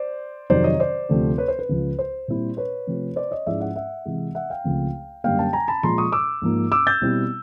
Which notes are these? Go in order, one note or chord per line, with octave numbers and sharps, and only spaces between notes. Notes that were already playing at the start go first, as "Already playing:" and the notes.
Already playing: C5 D5
F2 C3 D#3 F#3 C5 D5
C#5 D#5
C5 D5
D2 C3 F3 A3 C4
B4 C#5
C5
B4
C#2 C#3 F3
C5
A#2 G3 C4 E4
B4 C#5
C3 F3 A3 C4
C5 D5
C#5 D#5
G#2 F3 G#3 C#4 E4 D5 E5
E5 F#5
E5 F#5
C3 E3 G#3
E5 F#5
F5 G5
C#2 C#3 F3 A3 C4
F#2 D3 G3 A#3 F5 G5
G5 A5
G#5 A#5
A5 B5
A#2 F3 G#3 A#5 C6
C#6 D#6
D6 E6
G#2 F3 A#3
D6 E6
G6 A6
B2 G3 C4 E4